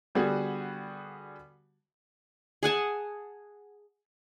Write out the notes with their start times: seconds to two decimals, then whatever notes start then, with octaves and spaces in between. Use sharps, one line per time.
0.15 D3 G3 B3 F#4 G#4
2.63 G#4 F#5 G#5 A5